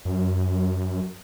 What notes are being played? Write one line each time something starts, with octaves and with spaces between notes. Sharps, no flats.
F#2